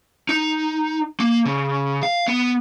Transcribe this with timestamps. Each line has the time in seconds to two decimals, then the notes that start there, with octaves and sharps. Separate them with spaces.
0.29 D#4
1.20 A#3
1.45 C#3
2.03 F5
2.28 B3